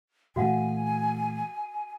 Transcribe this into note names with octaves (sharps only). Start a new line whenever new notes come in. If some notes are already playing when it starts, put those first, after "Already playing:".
A#2 E3 A3 F#4 F5 F#5 G#5